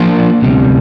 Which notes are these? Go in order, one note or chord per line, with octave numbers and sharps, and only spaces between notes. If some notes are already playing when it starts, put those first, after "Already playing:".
Already playing: F3 A#3 D4 F4 C5
D2 C3 G3